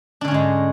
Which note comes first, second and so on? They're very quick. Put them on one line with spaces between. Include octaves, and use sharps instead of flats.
D4 D3 C#4 G#2 G#3